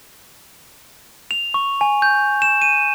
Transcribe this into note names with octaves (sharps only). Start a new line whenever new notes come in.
F7
C#6
G#5
G6
E7
D#7